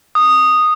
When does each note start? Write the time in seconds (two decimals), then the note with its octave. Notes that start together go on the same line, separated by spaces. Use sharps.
0.15 D#6